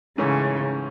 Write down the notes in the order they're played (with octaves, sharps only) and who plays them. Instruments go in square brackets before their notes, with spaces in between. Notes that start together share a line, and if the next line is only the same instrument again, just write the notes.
[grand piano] G#2 E3 A3 C#4 [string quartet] C#3